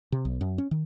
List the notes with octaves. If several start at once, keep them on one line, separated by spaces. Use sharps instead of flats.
C3
B1
F#2
C#4
D#3